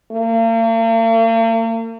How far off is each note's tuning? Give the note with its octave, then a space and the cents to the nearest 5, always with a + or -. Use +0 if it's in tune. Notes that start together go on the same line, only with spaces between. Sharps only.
A#3 -45